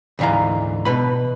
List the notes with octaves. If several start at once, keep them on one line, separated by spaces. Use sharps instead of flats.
D2 G#2 E3 F5 A#5
B2 B4 B5